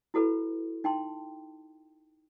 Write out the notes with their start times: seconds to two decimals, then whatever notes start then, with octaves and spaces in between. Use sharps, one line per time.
0.14 E4 F#4 A4 B4 B5
0.84 D#4 G5 A5 C6